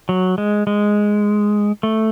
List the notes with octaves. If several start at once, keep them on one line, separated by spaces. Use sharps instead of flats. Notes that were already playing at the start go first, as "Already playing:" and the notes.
F#3
G#3
G#3
A3